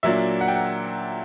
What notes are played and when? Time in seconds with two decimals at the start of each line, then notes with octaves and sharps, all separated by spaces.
0.03 A#2 F#3 A#3 D4 E5
0.41 F#5
0.48 G5
0.55 F#5